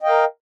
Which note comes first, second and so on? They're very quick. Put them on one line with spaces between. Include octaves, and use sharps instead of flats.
D#5 G5 F5 A#4